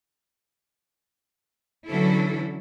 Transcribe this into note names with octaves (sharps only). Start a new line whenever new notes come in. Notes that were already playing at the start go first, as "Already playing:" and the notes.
D3 E3 F#3 C#4 E4 A4